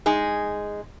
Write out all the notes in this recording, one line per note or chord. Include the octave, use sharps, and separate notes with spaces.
G#3 D#4 G#4